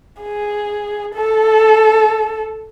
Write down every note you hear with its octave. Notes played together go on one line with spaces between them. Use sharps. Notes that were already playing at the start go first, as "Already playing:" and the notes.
G#4
A4